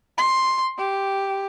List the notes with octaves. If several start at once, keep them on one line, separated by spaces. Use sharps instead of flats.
C6
G4